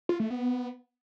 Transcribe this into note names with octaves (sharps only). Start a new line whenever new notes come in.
F4
A3
B3